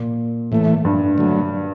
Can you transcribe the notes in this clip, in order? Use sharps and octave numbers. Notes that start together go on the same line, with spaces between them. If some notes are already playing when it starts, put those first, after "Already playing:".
Already playing: A#2
A2 E3 A3
G2
D3 F#3 A3